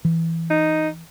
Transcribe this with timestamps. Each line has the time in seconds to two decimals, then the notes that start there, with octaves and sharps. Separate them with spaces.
0.05 E3
0.50 D#4